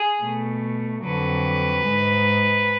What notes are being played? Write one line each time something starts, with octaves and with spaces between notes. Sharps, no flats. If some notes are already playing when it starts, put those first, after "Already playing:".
Already playing: G#4
B2 A3
F2 D3 F#3 B4
G#2 G#3